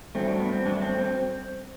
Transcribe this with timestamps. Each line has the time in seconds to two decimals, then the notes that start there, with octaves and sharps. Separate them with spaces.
0.15 G2 F#3 A3 C4
0.28 D4
0.40 B3
0.53 C4
0.65 G2 F#3 A3 D4
0.82 C4
0.98 C4